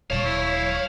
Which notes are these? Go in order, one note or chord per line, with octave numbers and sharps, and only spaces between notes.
D1 A#2 G3 C#5 F5 A5
E4